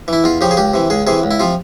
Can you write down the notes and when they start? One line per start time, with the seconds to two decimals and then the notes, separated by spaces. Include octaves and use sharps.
0.08 E3 E4
0.24 E2 F4
0.41 C#3 F3 G4
0.51 G#4
0.57 C#2 G4
0.74 C3 E3
0.90 C#2 G#4
1.07 C3 E3 G#4
1.23 C#2
1.31 E4
1.40 C3 F3 F4